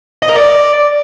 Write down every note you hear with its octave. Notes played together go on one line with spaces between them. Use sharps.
D#5
A#4
D5